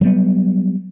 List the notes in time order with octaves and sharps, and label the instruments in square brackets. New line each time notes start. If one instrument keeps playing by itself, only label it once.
[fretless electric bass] F#3 G3 B3